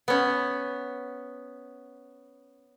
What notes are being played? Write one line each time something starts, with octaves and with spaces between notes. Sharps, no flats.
B3 C#4